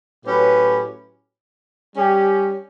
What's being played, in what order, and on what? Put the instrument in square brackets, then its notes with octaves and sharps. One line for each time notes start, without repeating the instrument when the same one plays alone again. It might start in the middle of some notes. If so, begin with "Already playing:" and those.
[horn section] A2 F#3 C#4 G4 B4
G3 C#4 G4